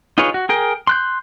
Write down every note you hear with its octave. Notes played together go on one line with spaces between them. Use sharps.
D#4 F4 G#4 B4 C#5
F#4
G#4 A#4 G5
C6 F#6 G6